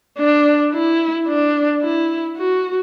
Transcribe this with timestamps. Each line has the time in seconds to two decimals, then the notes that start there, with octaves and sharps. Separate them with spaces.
0.19 D4
0.73 E4
1.28 D4
1.82 E4
2.37 F#4